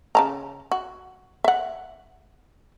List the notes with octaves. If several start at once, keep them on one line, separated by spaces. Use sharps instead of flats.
C#3 A5 A#5
F#4
E5 F#5